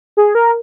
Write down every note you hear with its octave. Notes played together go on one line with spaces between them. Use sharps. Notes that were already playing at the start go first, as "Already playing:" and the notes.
G#4
A#4